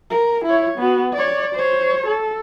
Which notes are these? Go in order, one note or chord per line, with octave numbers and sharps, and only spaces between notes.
A#4
E4 C#5
B3 F#4
C#5 D5
C5 C#5
A4